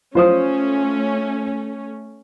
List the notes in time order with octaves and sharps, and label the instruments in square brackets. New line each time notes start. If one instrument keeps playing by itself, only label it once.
[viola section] A3 C#4 [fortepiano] F4 C5 D#6